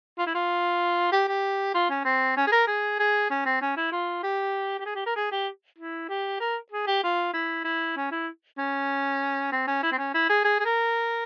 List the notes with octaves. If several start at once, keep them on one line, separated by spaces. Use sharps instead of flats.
F4
E4
F4
G4
G4
F4
C#4
C4
C#4
G#4
A#4
G#4
G#4
C#4
C4
C#4
E4
F4
G4
G4
G#4
G4
A#4
G#4
G4
E4
G4
A#4
G#4
G4
F4
E4
E4
C#4
E4
C#4
C4
C#4
E4
C4
C#4
E4
G#4
G#4
G#4
A#4